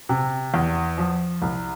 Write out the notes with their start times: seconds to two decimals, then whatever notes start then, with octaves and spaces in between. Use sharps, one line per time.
0.09 C3
0.54 E2
0.98 F3
1.42 C2